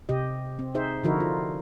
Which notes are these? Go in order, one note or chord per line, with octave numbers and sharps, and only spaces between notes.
C3 G4 D#5
C4
D#4 G#4 C5 E5
D3 F3 D#4 E4 F#4 A#4
F4